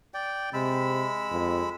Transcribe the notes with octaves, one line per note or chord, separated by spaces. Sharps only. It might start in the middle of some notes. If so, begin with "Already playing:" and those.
D5 G5
C3 G#3 B5 E6
F2